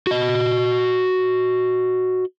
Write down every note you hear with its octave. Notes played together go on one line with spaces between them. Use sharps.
F#4 D#5